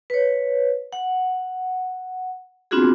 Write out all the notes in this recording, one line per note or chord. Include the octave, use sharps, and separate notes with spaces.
B4 C#5
F#5
B3 C4 D4 F4 F#4 G#4